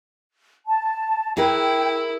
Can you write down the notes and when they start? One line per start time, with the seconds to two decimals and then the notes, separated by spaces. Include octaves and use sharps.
0.67 A5
1.37 E4 G#4 A#4 B4 G5